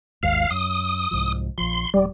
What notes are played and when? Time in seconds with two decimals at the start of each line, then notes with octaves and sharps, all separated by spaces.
0.23 G#1 D#2 G#2 F5
0.51 F#2 D#6
1.11 C2 G#2 F3
1.58 A#1 F3 C6
1.94 D#1 G3